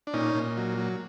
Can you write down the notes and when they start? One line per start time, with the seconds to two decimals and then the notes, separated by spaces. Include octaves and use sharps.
0.07 D4
0.13 A#2 C#4 D#4
0.35 A#2
0.57 F#3
0.78 F#3